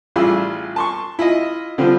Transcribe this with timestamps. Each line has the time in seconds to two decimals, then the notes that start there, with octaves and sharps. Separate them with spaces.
0.16 A1 G3 E4 F4 G#4 E6
0.76 A5 C6 C#6
1.19 E4 F4 D#5
1.78 D3 F3 G3 C4 F4